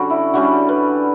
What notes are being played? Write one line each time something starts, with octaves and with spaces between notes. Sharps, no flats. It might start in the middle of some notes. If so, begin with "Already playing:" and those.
Already playing: D3 G3 C#4 F#4
E4
D3 G3 C#4 F#4
B4